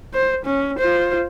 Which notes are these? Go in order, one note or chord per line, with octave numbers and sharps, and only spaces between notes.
C5
C#4
F4 C5